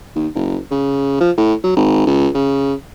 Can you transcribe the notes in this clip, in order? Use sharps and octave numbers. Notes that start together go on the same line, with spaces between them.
D#2
F#1
C#3
F3
A2
F#3
G#1
C#2
C#3